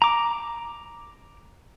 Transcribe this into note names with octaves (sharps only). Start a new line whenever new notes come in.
A#5 D6